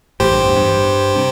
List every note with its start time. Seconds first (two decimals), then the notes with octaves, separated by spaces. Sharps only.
0.20 A1 A2 G4 C5
0.32 G2
0.44 E2
0.57 G2
1.16 C3